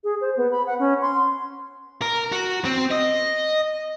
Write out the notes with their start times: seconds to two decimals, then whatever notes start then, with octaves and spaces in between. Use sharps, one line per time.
0.04 G#4
0.21 C5
0.37 B3
0.51 B5
0.66 F#5
0.79 C#4
1.02 C6
2.02 A#4
2.32 F#4
2.65 C4
2.91 D#5